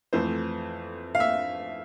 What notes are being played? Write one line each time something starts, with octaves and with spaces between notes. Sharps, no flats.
F2 E3 A3 C4 C5
F5
E5